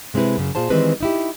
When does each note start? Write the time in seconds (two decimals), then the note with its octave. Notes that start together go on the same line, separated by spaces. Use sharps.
0.14 C3 G#3 C4 E4 B4
0.37 F#2 C#3
0.55 A#2 F4 G#4 C5 A5
0.70 D#3 E3 G3 G#3 C4 B4
1.01 D#4 E4 G4